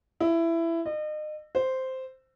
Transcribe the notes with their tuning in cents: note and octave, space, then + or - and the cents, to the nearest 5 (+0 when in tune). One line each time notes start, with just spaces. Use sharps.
E4 +15
D#5 -35
C5 -5